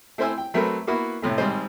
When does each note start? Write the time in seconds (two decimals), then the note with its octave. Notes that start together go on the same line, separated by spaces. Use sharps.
0.18 A3 C4 E4 C5 G#5 E6
0.38 G5
0.54 F#3 A3 C4 A#4 B4
0.87 A#3 B3 E4 F#4 B4
1.22 A2 C3 A3
1.37 G#1 G3 G#3 C4 C5 D#5